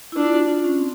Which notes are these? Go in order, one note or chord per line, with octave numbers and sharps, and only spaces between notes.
E4
D4 F4
F#4
F4
C#4
C4